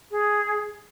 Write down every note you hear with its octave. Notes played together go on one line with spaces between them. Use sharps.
G#4